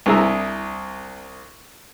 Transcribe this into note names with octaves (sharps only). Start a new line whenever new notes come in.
C2 D4 E4 G#4 A#5 E6